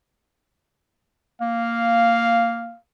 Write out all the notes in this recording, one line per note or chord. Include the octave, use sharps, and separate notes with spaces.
A#3 F5